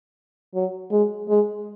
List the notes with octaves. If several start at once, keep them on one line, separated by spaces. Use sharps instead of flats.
F#3
G#3
G#3